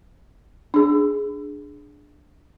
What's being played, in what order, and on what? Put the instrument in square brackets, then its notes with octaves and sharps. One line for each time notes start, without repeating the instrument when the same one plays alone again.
[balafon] D4 G#4